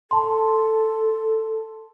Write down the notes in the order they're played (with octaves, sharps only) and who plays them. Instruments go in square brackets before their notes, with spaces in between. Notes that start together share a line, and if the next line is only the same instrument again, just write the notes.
[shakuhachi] A4 [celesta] A5 C6